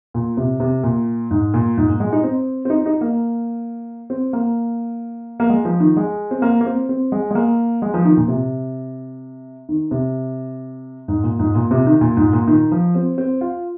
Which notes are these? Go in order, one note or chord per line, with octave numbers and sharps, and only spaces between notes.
A#2
C3
C3
A#2
G#2
A#2
G#2
A#2
G#3
D#4
C4
C4
D#4
D#4
A#3
C4
A#3
A#3
G#3
F3
D#3
G#3
C4
A#3
A#3
C4
C4
G#3
G#3
A#3
G#3
F3
D#3
A#2
C3
D#3
C3
G#2
A#2
G#2
A#2
C3
D#3
A#2
G#2
A#2
D#3
F3
C4
C4
F4